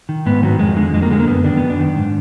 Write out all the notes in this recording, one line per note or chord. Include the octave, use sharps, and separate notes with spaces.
D#3
G#2 B3
D#3 F#3
F2 G#3
D3 G#3
F2 G#3
A#3
D3 G#3
A#3
F#2 B3
D#3 D4
F#2 B3
D4
D#3
G#2